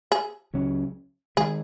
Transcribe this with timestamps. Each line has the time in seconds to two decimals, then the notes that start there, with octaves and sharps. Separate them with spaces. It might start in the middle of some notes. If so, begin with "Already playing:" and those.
0.12 G#4
0.53 C#2 C#3 F#3 C#4
1.37 D#3 G#3 G#4